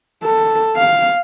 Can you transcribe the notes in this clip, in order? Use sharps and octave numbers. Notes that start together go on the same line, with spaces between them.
A4
F5